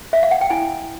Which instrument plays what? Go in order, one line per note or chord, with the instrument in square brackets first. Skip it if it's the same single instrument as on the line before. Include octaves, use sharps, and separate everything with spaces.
[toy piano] E5
F5
F#5
G5
E4 G#5